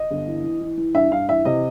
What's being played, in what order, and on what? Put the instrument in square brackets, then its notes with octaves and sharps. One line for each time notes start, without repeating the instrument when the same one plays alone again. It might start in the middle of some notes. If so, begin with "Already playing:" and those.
Already playing: [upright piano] D#5
G1
E3
E3
E3
E3
G2 E5
G2 F5
E3 E5
C3 D#5